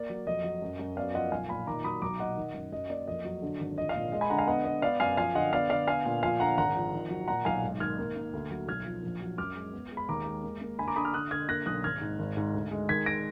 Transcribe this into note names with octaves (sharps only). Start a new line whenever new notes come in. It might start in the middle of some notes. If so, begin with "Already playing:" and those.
Already playing: A#3 D5
F#3
F2 D#5
F#3
F#2
F#2
B3 D5 F5
F3 D#5 F#5
B1 F5 G#5
A#2 G#5 B5
D#3 A#5 D6
F#3 B5 D#6
B1 A#5 D6
A#2 D#5 F#5
D#3
F#2
F#2 D#5
A#3 D5
F2 D#5
F#3
D3
G#1
F3 D#5
F5
A#2 D#5
G#3 D#5
G#5 B5
D3 F#5 A#5
F5 G#5
B3 D#5 F#5
B3 D#5
B3 D5 F5
F#2 F5 G#5
F3 F5 G#5
D3 D#5 F#5
B3 D5 F5
D3 D5 F5
B3 F5 G#5
A#2
F3 F5 G#5
D3 F#5 A#5
G#1 F#5 A#5
F3
D#3
F#3
A#2 F#5 A#5
B1 F5 G#5
G#2
D#3 F6 G#6
A#3
A#3
D2
F#3
B1 F6 G#6
F3
A#1
F#3
F#2 D6 F6
G#3
B3
G#3
B5
D#2 A#5 D6
G#3
A#3
A#3
D3 G#5 B5
A#5 D6
D3 B5 D#6
D6 F6
D3 D#6 F#6
D3 F6 G#6
A#3 F#6 A#6
B1 D#6 F#6
G#1 F6 G#6
G#2
G#1
G#2
D2
G#3
D#3 G#6 B6
A#6 D7